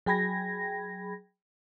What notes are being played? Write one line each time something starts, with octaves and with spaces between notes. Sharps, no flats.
F#3 G#4 G5 B5 G#6 A#6